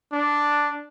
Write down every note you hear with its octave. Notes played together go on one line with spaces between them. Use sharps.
D4